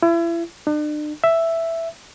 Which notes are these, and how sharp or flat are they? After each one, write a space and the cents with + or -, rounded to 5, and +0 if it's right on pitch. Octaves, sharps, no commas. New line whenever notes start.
E4 +35
D4 +40
E5 +5